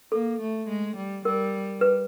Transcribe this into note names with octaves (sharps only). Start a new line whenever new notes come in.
A#3 A4
A3
G#3
G3
G3 A#4
B4